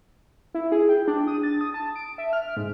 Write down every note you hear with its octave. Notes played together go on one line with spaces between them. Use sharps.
E4
G#4
G5
D4
D#6
A6
D#6
A5
D7
E5
F6
G#2